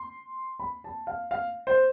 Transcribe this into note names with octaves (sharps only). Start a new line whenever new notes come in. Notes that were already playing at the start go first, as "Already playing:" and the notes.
Already playing: C6
B5
A5
F5
F5
C5